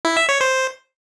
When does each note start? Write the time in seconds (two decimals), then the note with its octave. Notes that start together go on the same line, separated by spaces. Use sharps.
0.05 E4
0.17 E5
0.29 C#5
0.41 C5